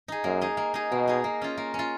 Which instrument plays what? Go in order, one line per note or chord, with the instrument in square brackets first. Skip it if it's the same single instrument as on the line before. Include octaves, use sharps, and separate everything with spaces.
[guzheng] D#4 G#4
[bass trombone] F#2 [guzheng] A#3
[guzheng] D#4 G#4
A#3
D#4 G#4
[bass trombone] B2 [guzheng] A#3
[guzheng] D#4 G#4
A#3
C#4 F4
A#3
C#4
F4